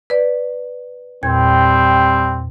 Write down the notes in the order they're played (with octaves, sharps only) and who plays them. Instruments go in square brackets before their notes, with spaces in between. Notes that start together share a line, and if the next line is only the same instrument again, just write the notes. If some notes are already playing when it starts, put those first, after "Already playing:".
[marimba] B4 D5
[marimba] E2 A#2 G#6 [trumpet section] G3 C4